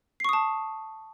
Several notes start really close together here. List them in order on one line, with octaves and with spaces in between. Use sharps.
C7 C#6 D#6 A5